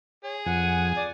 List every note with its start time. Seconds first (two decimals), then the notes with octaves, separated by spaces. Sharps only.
0.24 G#4 C#5
0.46 F2 F#5 G#5
0.97 D5